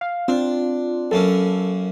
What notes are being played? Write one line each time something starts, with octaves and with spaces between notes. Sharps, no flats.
F5
C4 D4 F4
F#2 A#3 C#4 A4